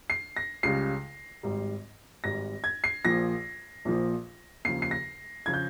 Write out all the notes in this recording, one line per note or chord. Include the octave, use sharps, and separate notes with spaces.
C7
A#6
C#2 C#3 G3 C7
G#1 G#2 G3
G#1 G#2 G3 A#6
G#6
C7
A#1 A#2 F3 A#6
A#1 A#2 F3
D#2 C#3 F3 C7
C7
A#6
C#3 F3 G#6
G6